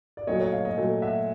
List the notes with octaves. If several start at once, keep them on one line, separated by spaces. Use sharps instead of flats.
D5
A#2 F#3 A3 C#5 D#5
C#5 D#5
D#5 F5
C#5 D#5
A#2 F#3 A3
E5 F#5